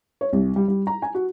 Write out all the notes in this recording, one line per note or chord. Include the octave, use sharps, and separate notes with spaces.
C#5
C2
G3
G3
A#5
G#5
F#4